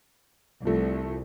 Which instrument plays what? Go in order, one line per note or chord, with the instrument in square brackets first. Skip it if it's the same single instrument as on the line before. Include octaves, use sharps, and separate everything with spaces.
[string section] C2 [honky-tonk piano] F3 A3